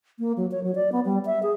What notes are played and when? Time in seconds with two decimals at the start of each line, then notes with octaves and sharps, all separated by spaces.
0.19 A#3
0.37 F#3
0.51 C#5
0.64 F#3
0.75 D5
0.92 B3
1.05 G3
1.26 E5
1.43 G#4